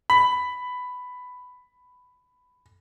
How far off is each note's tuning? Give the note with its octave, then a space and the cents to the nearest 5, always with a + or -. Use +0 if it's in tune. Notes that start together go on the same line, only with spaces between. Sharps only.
B5 +10